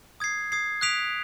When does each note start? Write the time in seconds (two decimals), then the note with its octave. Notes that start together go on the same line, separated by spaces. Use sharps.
0.20 D#6 G#6 C7
0.52 D#6 G#6 C7
0.81 D#6 F#6 B6 D7 F7